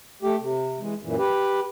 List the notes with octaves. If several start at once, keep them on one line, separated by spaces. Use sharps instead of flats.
A3 G4
C3
E3 G#3
F#2 A#2 E3
G4 B4